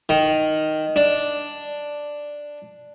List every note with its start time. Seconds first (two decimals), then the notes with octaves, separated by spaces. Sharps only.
0.09 D#3
0.96 D4